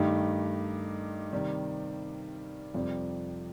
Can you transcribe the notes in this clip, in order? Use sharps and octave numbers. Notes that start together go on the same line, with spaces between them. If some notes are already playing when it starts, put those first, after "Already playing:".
Already playing: G2 D#3 A3 D#4 G4
C3 D#3 G3
F2 C3 G3